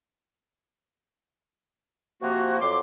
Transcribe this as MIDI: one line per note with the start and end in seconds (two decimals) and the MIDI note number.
2.21 2.57 48
2.21 2.57 53
2.21 2.57 58
2.21 2.57 66
2.61 2.78 41
2.61 2.78 54
2.61 2.78 84
2.61 2.78 86